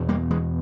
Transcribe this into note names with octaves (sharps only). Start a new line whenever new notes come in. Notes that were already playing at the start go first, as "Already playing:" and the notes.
Already playing: E2 B2
G3 A#3
E3 G#3